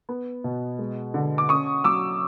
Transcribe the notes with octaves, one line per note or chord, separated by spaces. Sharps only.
B3
B2
G#3
D3
D6
C#4 C#6 D#6
F#3 D6 E6